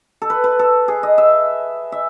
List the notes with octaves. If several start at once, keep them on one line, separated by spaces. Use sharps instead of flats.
A4
B4
B4
A4
G#4
D#5
E5
E5